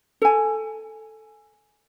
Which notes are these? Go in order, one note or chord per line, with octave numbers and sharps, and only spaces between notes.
A4 G#5